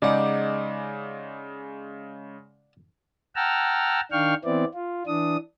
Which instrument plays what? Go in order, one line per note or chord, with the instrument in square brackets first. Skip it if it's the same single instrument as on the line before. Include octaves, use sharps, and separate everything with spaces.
[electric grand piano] C#3 G#3 D6 [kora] D#4 G4 [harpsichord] D5 F#5
[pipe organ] F#5 G5 A5 A#5 E6 F6
D#3 D4 F5 G5 C#6 F6
E3 B3 C4 E4 D5
F4
E3 D4 D#6